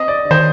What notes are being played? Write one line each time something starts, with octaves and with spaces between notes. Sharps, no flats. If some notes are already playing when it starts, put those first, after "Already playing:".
Already playing: C4 D#5
D5
D3
D#3 C5